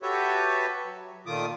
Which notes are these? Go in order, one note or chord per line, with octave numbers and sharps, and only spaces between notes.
F#4 G4 A4 B4 C#5 E5
F#3
A#2 D#3 A3 F4 D6 D#6